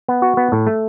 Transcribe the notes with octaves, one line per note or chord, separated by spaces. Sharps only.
B3
F#4
B3
A2
A3